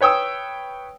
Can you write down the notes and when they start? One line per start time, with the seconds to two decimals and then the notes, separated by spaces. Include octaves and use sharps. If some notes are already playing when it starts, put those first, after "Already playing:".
0.01 B4 C#5 G5 D#6 E6